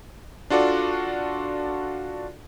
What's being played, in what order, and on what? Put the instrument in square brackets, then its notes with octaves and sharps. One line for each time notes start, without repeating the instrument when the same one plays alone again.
[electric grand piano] D4 F4 F#4 A4 D5